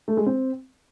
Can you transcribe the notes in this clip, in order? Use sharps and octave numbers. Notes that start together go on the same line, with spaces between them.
A3
G#3
C4